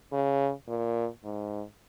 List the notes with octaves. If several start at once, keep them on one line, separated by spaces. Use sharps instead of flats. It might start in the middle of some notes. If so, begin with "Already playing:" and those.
C#3
A#2
G#2